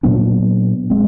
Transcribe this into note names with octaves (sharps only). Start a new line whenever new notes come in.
A#2 F#3 B3 D4
G#3 C4